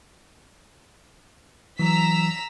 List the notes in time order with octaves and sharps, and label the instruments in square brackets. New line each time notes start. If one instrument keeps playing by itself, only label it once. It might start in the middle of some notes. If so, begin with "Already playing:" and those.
[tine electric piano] E3 F#3 [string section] A#5 E6 B6